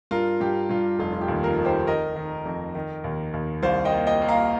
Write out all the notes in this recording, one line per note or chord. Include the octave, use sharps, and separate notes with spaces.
G2 F4 A#4
G2 G4
G2 F4
F1 F4
F4
G4
D#2
F4 A#4
D#3
G4 C5
D#3 A#4 D#5
D#3
F2
D#3
D#2
D#2
C2 C5 F5
D#5 G5
A#3
D#5 G5
A#3
F5 A#5